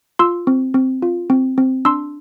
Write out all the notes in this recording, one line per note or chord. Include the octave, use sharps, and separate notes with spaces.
F4 C6 E6
C4
C4
F4
C4
C4
D4 C6 E6